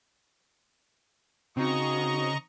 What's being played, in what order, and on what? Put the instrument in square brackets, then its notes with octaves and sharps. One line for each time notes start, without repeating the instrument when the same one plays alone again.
[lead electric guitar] C#3 [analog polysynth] C4 D#4 [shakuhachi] F#4 [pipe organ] D#5 A#5 C#6